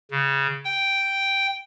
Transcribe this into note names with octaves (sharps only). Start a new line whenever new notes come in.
C#3
G5